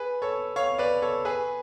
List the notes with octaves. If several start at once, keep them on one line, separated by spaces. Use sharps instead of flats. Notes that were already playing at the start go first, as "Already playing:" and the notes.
Already playing: G#4 B4
A4 C#5
C#5 F5
B4 D5
A4 C#5
G#4 B4